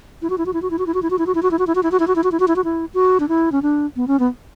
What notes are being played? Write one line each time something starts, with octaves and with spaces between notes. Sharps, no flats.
E4
F#4
E4
F#4
E4
F#4
E4
F#4
E4
F#4
E4
F#4
E4
F#4
E4
F#4
E4
F#4
E4
F#4
E4
F#4
E4
F#4
E4
F#4
E4
F#4
E4
F#4
E4
F#4
D4
E4
C#4
D4
B3
C#4
B3